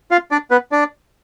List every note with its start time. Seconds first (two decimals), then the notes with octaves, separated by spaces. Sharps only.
0.11 F4 F5
0.31 D4 D5
0.51 B3 B4
0.72 D4 D5